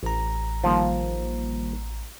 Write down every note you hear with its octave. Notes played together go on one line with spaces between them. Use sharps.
A1 A#5
D#3 F3 G3 A#3